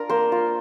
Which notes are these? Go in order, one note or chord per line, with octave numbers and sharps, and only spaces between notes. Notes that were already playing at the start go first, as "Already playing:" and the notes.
Already playing: D4 F4 A#4
A#3 C5
F4